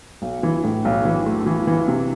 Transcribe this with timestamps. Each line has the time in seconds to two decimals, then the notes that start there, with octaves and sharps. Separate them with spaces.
0.22 B1
0.43 E3
0.64 A2
0.85 B1
1.05 E3
1.26 A3
1.46 E3
1.67 E3
1.88 C3